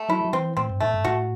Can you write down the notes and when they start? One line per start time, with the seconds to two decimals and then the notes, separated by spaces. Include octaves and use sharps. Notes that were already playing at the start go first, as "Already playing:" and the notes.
Already playing: A3
0.09 F#3 E4
0.25 F#3
0.33 E3 C4
0.57 A2 C4
0.70 G2
0.81 A2 A3
0.93 G2
1.05 A2 F#4